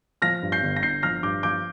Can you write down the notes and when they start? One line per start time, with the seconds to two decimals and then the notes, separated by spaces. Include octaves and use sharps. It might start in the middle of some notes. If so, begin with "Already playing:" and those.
0.22 F3 F6 A#6
0.42 G2
0.52 G6 C7
0.63 G1
0.76 A#6
0.83 G1 G6 C7
1.03 F3 F6 A#6
1.23 G2 D6 G6
1.43 F3 D6 G6